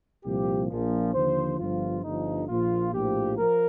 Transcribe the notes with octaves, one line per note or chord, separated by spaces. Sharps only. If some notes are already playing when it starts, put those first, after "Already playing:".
C2 A#2 F3 G4
A#1 A#2 F3
D#2 D3 F3 C5
G1 G2 F3 F4
G1 G2 D3 F3 D#4
A#1 A#2 F3 F4
A#1 A2 F3 G4
F3 A#4